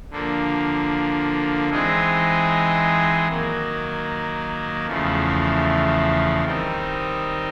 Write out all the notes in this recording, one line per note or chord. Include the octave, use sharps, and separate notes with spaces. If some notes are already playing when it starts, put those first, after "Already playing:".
D3 F3 A#3
E3 G#3 C4 D#4 G#4
D#3 F#3 A#3
E2 C#3 F3 A3
D#3 G3 C4 D#4